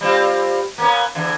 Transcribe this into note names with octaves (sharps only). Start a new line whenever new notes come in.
G3 C4 F4
A#3 B3 C#4
E2 D3 E3